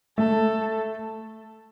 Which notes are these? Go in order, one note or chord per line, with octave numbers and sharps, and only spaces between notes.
A3 A4